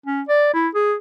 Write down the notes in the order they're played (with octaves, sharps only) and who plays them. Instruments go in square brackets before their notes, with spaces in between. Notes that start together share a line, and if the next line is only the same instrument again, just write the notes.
[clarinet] C#4
D5
E4
G#4